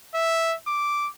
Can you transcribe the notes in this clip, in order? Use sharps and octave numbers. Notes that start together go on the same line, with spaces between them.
E5
D6